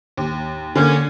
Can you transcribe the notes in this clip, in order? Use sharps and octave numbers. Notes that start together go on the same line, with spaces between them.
D#2
D3 A#3 C#4 G#6